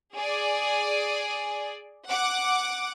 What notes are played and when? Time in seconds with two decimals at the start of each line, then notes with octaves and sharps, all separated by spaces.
0.16 G#4 D5
2.08 F#5 D6